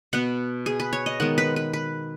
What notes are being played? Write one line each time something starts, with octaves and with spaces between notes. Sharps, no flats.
B2 B3 F#5
G#4
B4
C#5
D#5
D#3 G#3 B3 F#5
B4
B4
B4